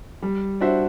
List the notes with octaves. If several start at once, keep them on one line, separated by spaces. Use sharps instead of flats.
G3
D4 F#4 C5 E5